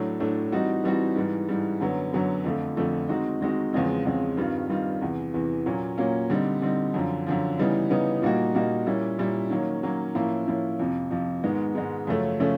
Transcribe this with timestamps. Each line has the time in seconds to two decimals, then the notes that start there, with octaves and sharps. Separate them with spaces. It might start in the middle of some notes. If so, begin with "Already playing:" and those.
Already playing: A2 F#3 A3 D4
0.20 A2 F#3 A3 D4
0.52 E3 G3 C4 D#4 F#4
0.84 E3 G3 C4 D#4 F#4
1.16 G#2 E3 G3
1.49 G#2 E3 G3
1.80 F#2 D3 F#3 B3
2.13 F#2 D3 F#3 B3
2.44 F2 D3 F3 A3
2.77 F2 D3 F3 A3
3.09 D#3 G#3 C4 D#4 F#4
3.41 D#3 G#3 C4 D#4 F#4
3.73 E2 C#3 F3 G#3 C4
4.05 E2 C#3 F3 G#3 C4
4.37 G2 D#3 G3 C4 F4
4.69 G2 D#3 G3 C4 F4
5.01 E2 C3 E3
5.34 E2 C3 E3
5.66 A#2 F#3 A#3 C#4
5.98 A#2 F#3 A#3 C#4
6.30 D3 G3 C4 D#4
6.62 D3 G3 C4 D#4
6.94 F#2 D3 F3
7.27 F#2 D3 F3
7.57 C#3 E3 G3 B3 D#4
7.90 C#3 E3 G3 B3 D#4
8.22 A#2 G3 A#3 D#4 F#4
8.55 A#2 G3 A#3 D#4 F#4
8.87 A#2 G3 A#3 C#4 E4
9.18 A#2 G3 A#3 C#4 E4
9.50 D#3 F#3 A#3 C#4
9.83 D#3 F#3 A#3 C#4
10.15 A2 F3 A#3 C#4 E4
10.47 A2 F3 A#3 C#4 E4
10.79 F2 C3 F3
11.11 F2 C3 F3
11.43 G#2 D#3 G#3 B3
11.75 G#2 D#3 G#3 B3
12.07 F#2 C#3 F3 A3 C#4
12.40 C#3 F3 A3 C#4